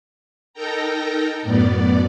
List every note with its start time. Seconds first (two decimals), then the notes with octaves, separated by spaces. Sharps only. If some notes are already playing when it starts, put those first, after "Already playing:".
0.54 D#4 A4 A#4 G5 A#5
1.42 F#2 A2 B3 D5